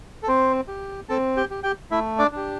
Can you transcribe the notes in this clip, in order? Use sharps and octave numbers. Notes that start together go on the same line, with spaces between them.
A4
C4 C5
G4
C4 A4 A5
G4 G5
G4
G4 G5
A3 E4 E5
D4 D5
D4 G4